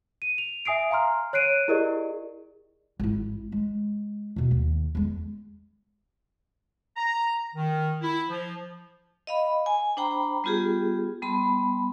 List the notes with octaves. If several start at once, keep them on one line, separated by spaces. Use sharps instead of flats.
D#7
F7
E5 G#5 D#6 C7 D7
F5 G#5 A#5 C6 F6
C#5 F#6 C7 D7 D#7
E4 G4 G#4 A#4 D5 D#5
G#1 E4
G#3
E2 B2
D#2 D#3
E2 G#3
A#5
D#3
E4
F3
D#5 F5 B5
G#5
D4 C5 G5 A#5 B5
G3 B3 F4 G4 G#4
G3 B3 A5 B5 C6